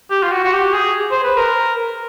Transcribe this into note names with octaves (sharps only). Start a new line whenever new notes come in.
G4
F4
F#4
F#4
G4
G#4
C5
B4
A#4